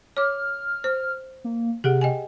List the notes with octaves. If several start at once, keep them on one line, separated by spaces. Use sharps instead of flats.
C#5 D6 F6
C5
A#3
C3 G4 G#4 F#5
D#5 G5 G#5